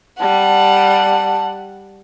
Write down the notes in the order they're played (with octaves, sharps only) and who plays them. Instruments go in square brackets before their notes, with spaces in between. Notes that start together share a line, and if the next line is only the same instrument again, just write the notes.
[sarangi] G3 [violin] F#5 [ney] A5